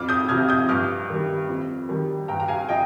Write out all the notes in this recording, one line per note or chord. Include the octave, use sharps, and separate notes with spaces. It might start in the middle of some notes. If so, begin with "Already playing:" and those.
Already playing: F2 D6 F6
D#6 G6
C3 F3 F6 G#6
D#6 G6
G2 D6 F6
D#3 G3
F2
D#3 G3
G2 G5 A#5
A#5
F5 G#5
F3 D#5 G5